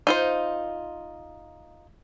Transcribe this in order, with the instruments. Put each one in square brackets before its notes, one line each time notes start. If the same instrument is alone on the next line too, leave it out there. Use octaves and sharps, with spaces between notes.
[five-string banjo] D#4 F4 C5